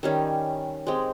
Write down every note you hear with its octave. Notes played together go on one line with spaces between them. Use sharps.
D#3 G3 C#4
G#3 C4 G4